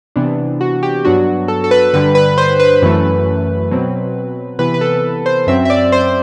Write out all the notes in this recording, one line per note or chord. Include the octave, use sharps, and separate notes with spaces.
C3 E3 B3 D4
F#4
G4
G2 F#3 B3 D4 F#4
A4
A4
B4
G2 D3 G3 B4
B4
C5
B4
F#2 E3 A3
B2 F#3 C4
C3 E3 B3 B4
B4
A4
C5
F#2 F#3 C4 E5
E5
D5
C5